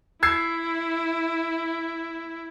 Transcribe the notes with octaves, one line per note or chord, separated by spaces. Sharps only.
E4 E6 G#6 C7